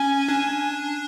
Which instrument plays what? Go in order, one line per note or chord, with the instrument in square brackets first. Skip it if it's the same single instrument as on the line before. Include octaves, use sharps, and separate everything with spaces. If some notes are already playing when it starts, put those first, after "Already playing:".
Already playing: [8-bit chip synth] C#4 [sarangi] G#5
[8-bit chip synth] D4